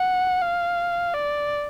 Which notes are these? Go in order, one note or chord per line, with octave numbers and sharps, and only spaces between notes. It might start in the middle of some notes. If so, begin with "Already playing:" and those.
Already playing: F#5
F5
D5